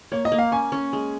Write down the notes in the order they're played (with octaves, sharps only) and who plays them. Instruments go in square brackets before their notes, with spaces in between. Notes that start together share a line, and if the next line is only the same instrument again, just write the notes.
[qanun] A#3 [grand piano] C#5
[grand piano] D#5
[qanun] A#3
[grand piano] F5
[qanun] C#4 [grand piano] G#5
[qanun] C#4
G#3